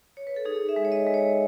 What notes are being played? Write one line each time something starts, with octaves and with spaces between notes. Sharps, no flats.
C#5
B4
A4
D#4 G#4
E5
G#3
C#5
D#5
G#3
C#5